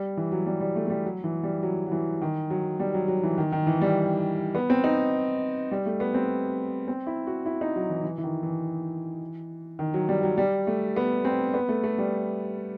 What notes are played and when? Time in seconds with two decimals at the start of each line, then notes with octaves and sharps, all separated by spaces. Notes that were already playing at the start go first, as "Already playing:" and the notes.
Already playing: G3
0.17 E3
0.32 F#3
0.46 G3
0.60 G3
0.76 A3
0.86 A3
0.90 G3
1.05 F#3
1.24 E3
1.43 G3
1.63 F#3
1.87 F#3
1.92 E3
2.22 D#3
2.50 F#3
2.80 G3
2.94 F#3
3.08 F#3
3.23 E3
3.38 D#3
3.52 D#3
3.67 E3
3.81 G3
4.55 B3
4.70 C4
4.84 D#4
5.71 G3
5.86 A3
6.00 B3
6.14 C4
6.88 C4
7.07 E4
7.27 F#4
7.46 E4
7.61 D#4
7.76 F#3
7.90 E3
8.04 E3
8.18 E3
8.24 D#3
8.43 E3
9.79 D#3
9.94 F#3
10.09 G3
10.23 F#3
10.38 G3
10.67 A3
10.96 B3
11.25 C4
11.54 B3
11.69 A3
11.84 A3
11.98 G3